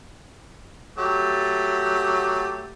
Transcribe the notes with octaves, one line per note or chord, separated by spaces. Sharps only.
F#3 A3 G4